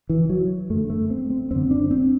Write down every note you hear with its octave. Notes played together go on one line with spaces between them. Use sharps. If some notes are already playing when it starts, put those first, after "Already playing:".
E3
F#3
F#2 D3 A3
A3
C4
C4
F#2 D3 C4
D4
C4